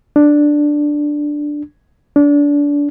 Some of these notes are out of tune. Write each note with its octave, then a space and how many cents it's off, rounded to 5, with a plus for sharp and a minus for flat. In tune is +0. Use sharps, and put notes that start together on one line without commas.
D4 +5
D4 -25